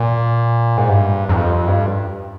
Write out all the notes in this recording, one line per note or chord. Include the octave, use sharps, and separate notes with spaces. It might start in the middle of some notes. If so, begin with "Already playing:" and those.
Already playing: A#2
G#2
G2
F2
G2